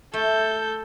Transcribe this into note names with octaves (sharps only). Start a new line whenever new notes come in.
A3 A4 G6